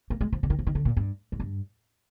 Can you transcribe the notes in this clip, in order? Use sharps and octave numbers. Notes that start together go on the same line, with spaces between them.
A#3
G#3
F3
D3
D#3
F3
D#3
D3
A#2
G2
G#2
G2